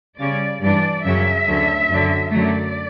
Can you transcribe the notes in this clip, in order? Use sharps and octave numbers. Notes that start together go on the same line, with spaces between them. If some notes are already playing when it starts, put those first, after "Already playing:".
C#3 G3 C#4 D5
G2 E3 G3 D4 D5
F#2 C#3 F#3 C#4 E5
D2 D3 F#3 C#4
F#2 D3 F#3
F#2 D3 F#3 A3 D5